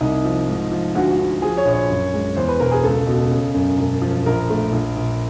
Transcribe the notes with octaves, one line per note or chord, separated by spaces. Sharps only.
C2 D#4
F3
G#2
F3
D2 F#4
F#4
D2
F3 G#4
C#5
A#1
C#5
F#2
G#3
E2 C5
B4
E1 A#4
G#4
C#2 A4
B2
C#3
F#2
E1
F3
A#1 A#4
A3
A#1
A#1